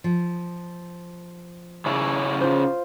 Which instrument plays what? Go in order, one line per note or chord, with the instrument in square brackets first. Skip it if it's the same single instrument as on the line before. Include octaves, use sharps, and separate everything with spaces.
[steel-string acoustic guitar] F3
[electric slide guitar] C#3 C#4 E4
[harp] F4 C5